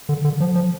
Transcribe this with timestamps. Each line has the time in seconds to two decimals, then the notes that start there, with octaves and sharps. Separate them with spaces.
0.09 D3
0.24 D3
0.40 F3
0.55 F3